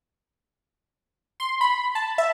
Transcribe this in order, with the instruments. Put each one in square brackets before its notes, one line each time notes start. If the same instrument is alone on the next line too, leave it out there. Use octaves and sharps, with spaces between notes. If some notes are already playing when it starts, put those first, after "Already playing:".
[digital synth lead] C6
B5
A5
E5